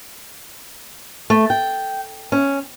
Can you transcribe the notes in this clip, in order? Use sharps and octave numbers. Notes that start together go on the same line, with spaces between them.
A3
G5
C#4